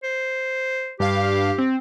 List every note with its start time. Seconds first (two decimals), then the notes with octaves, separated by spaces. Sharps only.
0.03 C5
1.00 G2 G4 F5
1.58 C4